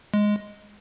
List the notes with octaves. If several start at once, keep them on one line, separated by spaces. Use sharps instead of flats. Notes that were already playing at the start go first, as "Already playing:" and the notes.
G#3